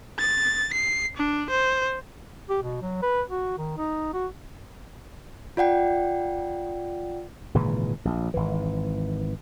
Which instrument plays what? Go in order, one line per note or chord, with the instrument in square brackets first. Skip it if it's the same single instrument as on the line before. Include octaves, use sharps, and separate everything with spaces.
[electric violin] A6
C7
D4
C5
[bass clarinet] G4
B2
F#3
B4
F#4
D#3
D#4
F#4
[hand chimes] F4 D5 F#5 G5
[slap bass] G#1 A#2 C#3 E3
A#1
G#1 E3